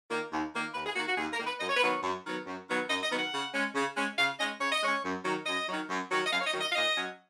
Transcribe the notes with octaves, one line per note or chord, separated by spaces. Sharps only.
D#3 A#3
D#2
D#3 A#3
D#2 B4
G#4
D#3 A#3 F#4
F#4
D#2 G#4
A#4
D#3 A#3
B4
F#2 D#5
C#5
B4
D#3 F#3 B3 C#5
F#2
D#3 F#3 B3
F#2
D#3 F#3 B3
F#2 D#5
D#5
D#3 F#3 B3
F#5
C#3
G#3 C#4
C#3
G#3 C#4
C#3 F5
G#3 C#4 D#5
C#3 C#5
D#5
G#3 C#4 C#5
F#2
D#3 F#3
F#2 D#5
D#3 F#3
F#2
D#3 F#3
D#5
F#2 F5
C#5
D#5
D#3 F#3
D#5
F5
A#2 D#5
F#3 C#4